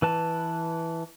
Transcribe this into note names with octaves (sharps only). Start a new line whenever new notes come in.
E3 B4 A5